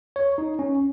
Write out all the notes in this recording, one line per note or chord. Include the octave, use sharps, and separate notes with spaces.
C#5
D#4
C#4